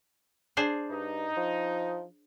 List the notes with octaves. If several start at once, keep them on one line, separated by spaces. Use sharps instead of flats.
D4 G#4 C5
G2 D#4
F3